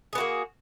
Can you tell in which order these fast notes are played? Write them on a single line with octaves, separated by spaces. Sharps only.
G#4 B3 F#4 A#3